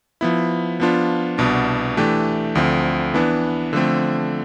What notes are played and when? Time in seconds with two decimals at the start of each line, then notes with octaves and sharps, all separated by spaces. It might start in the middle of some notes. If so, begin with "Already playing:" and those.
0.21 F3 B3 E4
0.80 F3 B3 D4 F4
1.38 C2 B2 B3 D4
1.97 E3 A3 D4 G4
2.55 D2 D3 F3 C4
3.14 E3 B3 D4
3.73 D3 F3 A3 C4